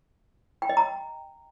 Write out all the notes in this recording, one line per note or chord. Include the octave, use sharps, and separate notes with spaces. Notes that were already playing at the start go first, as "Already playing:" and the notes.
G5
D#5
A#5